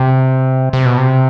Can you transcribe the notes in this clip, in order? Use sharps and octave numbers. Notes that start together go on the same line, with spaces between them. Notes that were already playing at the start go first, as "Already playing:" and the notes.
Already playing: C3
C3
B2
C3